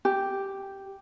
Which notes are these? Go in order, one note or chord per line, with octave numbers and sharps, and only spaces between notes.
G4